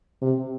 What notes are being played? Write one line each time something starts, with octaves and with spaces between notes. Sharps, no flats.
C3